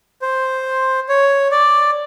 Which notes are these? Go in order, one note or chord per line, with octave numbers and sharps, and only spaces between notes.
C5
C#5
D5